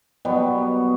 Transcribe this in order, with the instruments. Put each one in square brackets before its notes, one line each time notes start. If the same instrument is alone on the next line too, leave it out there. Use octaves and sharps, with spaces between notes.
[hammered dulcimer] B2 F#3 G3 B3